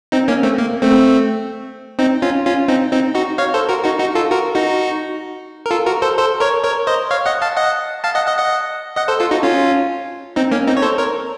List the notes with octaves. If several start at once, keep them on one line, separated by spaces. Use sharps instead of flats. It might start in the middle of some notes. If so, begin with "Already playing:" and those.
C4 D#4
A#3 C#4
A3 C4
A#3
A3 C4
C4 D#4
C#4 F4
C#4 F4
C4 D#4
C4 D#4
D#4 F#4
C#5 F5
A4 C5
F#4 A#4
D#4 F#4
D#4 F#4
F4 A4
F#4 A#4
D#4 F#4
A#4
F4 A4
F#4 A#4
A4 C5
A4 C5
A#4 C#5
A#4 C#5
C5 D#5
C#5 F5
D#5 F#5
F5 A5
D#5 F#5
F5 A5
D#5 F#5
D#5 F#5
D#5 F#5
D#5 F#5
A4 C5
F4 A4
D#4 F#4
C#4 F4
C4 D#4
A#3 C#4
C4 D#4
C#5
A4 C5
A#4 C#5